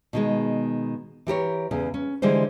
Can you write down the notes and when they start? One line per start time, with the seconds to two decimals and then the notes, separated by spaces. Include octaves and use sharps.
0.13 B2 D#3 G#3
1.27 E3 G4 A#4 C#5
1.71 E2 C#3
1.94 C#4
2.22 D3 E3 G3 G#3 C5